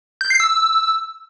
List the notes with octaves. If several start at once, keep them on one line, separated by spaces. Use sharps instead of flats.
G6
C7
E6